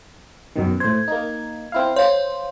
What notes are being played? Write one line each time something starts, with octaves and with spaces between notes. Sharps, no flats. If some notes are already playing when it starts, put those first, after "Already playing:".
F#2 B2 D#3
A2 C5 G#6
A#3 D#4
C4 E4 F5
C5 C#5 F5